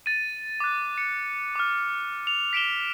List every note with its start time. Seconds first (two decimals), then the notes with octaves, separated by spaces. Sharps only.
0.06 A6 D#7
0.60 D6 F#6
0.98 C#7
1.55 D6 F6
2.27 F7
2.53 B6 D7 E7 G7